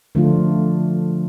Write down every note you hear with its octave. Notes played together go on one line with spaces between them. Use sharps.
D3 F3 A3 D4 F4